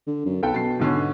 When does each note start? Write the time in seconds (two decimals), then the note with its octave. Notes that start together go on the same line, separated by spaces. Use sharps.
0.07 D3
0.25 F#2
0.43 B1 A4 B4 G5
0.54 B2 A5 C7
0.79 G#2 D3 C#4